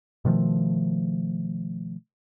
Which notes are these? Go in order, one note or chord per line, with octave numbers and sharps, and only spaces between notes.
B2 D#3 F3 A3